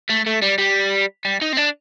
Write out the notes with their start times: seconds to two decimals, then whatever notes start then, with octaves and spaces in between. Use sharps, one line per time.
0.10 A3
0.27 A3
0.42 G3
0.59 G3
1.25 G3
1.41 D#4
1.53 C4
1.57 D4